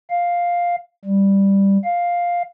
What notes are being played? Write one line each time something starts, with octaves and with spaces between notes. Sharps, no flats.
F5
G3
F5